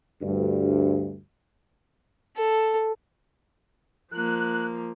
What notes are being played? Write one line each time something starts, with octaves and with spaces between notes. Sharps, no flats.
D2 G2
A4
F3 A#3 F#6